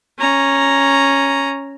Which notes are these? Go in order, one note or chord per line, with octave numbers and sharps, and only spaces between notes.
C#4 A#5